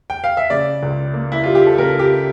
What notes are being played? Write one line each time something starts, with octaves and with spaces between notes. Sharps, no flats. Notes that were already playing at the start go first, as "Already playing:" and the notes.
G5
F5
E5
C#3 D5
C#2
A#3
E4
G3 F4
G4
A4
C#3 A#4
G4